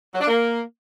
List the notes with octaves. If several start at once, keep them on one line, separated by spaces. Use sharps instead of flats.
F#3
D4
A#3